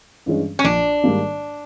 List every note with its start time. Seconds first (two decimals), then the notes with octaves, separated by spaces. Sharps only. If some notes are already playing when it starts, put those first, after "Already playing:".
0.26 G2 E3 G#3 C#4
0.59 C#4
0.64 A#1 D4
1.04 G#2 D#3 G3 A#3